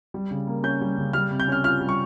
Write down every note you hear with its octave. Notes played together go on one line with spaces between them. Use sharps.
G3
C#3
A#3
C#4 G6
G3
C#3
G3 F6
C3
G6
C#4 F6
F4 F6
G3
C#6